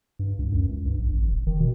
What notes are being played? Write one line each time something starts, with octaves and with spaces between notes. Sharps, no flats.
G2
C#2
F#2
C#2
G2
A#1
G#1
D#1
D#3
B2